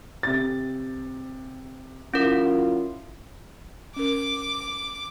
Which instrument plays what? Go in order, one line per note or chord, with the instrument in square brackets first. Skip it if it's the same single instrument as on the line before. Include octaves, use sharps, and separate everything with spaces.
[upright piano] C3 A6
[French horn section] F#3 E4 F4 [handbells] C#4 A#4
[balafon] C#4 A#4 [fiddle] D6